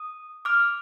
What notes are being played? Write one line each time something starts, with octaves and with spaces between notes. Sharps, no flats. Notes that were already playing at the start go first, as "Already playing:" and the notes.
Already playing: D#6
D6 F6